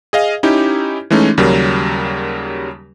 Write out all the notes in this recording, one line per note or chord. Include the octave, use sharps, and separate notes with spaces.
G#4 D#5 F5
C#4 D#4 E4 G4
E3 G#3 A3 C#4 D#4
D#2 C#3 F#3 G3 A#4